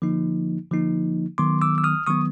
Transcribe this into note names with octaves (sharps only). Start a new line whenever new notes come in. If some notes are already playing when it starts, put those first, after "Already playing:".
D3 F3 A#3 D#4
D3 F3 A#3 D#4
D#3 F#3 B3 C6 D6
D6 E6
E6
D#6 F6
D#3 F#3 B3 C#6 D#6